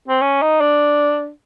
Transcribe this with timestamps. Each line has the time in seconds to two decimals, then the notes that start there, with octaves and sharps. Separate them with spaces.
0.08 C4
0.22 C#4
0.42 D#4
0.61 D4